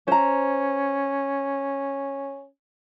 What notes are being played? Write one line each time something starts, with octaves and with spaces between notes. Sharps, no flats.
C#4 C5 A#5